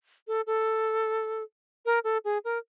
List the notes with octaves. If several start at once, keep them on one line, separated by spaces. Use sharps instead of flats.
A4
A4
A#4
A4
G#4
A#4